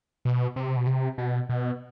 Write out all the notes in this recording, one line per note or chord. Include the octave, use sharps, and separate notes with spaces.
B2
C3
B2
C3
B2
B2